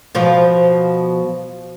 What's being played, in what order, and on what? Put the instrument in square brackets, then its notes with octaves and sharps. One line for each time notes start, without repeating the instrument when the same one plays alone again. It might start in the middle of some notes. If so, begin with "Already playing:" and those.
[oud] B2 F3 F4